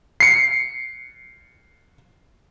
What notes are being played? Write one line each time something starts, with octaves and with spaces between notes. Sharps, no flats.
C7 C#7